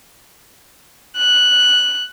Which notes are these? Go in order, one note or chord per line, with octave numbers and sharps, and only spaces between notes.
F#6